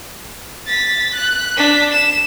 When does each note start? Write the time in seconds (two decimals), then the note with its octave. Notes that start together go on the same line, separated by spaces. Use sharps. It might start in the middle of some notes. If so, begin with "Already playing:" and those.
0.67 A6 B6
1.14 F#6
1.57 D4 B6
1.92 E7